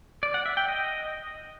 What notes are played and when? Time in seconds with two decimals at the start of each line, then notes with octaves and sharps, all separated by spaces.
0.23 D5
0.34 F#5
0.46 E5
0.57 G5
0.68 D#5